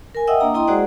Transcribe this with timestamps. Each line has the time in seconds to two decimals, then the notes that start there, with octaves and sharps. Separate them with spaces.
0.15 A#4 G#5
0.27 D#5 E5 F#5 G5 D#6 E6
0.40 A#3 D4 A#5 D#6
0.54 E4 D#5 G5 A#5 C6 D#6
0.67 G#3 F#4 G#4 C5 D5 F#5